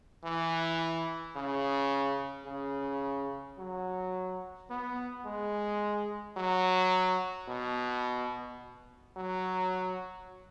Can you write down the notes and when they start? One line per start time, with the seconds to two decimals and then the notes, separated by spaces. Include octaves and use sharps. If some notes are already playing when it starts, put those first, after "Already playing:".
0.24 E3
1.36 C#3
2.46 C#3
3.58 F#3
4.70 B3
5.26 G#3
6.37 F#3
7.48 B2
9.16 F#3